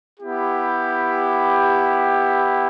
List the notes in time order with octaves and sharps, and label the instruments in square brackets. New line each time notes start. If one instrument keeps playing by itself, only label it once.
[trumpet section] B3 E4 G4